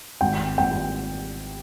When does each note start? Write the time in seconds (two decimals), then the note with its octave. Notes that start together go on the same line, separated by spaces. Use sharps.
0.21 G#1 G5
0.58 G#1 G5